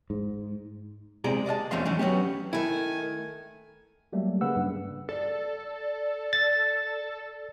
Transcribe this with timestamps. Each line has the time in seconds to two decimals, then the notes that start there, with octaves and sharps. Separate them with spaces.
0.10 G#2
1.24 C3 G#3 G#4 D5 A#5
1.46 D5 D#5 F5 A5
1.71 E2 F3 A3 C#4 F5 C6
1.85 E3 F#3 A3 C#4 D4
1.99 F#3 B3 C#4 G4
2.53 D#3 A3 E4 G#5
4.13 F#3 G3 A3 A#3
4.41 C#3 A#3 B4 F#5 E6
4.56 G2
5.09 A4 D5
6.33 A6